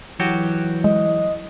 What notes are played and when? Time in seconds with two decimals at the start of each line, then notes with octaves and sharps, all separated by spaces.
0.20 E3 F#3 F#4 G4
0.84 G#3 D#5